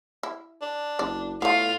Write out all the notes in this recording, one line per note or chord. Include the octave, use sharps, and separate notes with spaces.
E4
D4
F#1 D5
A2 A3 B3 F4 F5